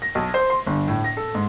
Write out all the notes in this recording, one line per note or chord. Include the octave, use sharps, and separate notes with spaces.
A#6
B1
C5
C6
G1
A2
A#6
A4
G#2